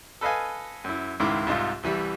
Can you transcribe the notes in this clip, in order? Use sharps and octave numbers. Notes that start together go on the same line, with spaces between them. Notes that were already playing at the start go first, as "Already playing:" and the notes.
A4 B4 D#5 F5 G#5
F#2 E4
C#2 G#2 D#3 E4 D6
C2 G#2 D#4 F4
C2 E3 G3